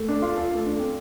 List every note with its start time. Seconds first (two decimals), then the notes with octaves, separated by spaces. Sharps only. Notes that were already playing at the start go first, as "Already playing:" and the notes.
Already playing: A3
0.08 D4
0.22 F4
0.37 A4
0.51 A3
0.66 D4
0.80 C4